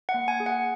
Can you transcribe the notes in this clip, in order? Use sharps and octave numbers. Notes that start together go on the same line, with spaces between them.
F#5
A#3
G#5
G#4
F#5